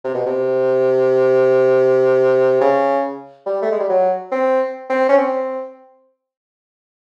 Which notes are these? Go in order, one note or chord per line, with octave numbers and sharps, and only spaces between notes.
C3
B2
C3
C#3
G3
A3
G#3
G3
F#3
C4
C4
C#4
C4